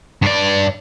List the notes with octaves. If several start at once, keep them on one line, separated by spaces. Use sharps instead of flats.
G2 D5